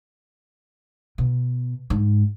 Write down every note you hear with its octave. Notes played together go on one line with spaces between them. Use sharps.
B2
G#2